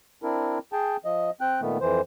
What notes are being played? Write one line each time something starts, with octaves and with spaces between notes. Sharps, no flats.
C4 D4 E4 A#4
G#4 G5 A5
F3 D#5
C4 G5 F#6
A#2 D#3 A3 B3
F2 E3 C5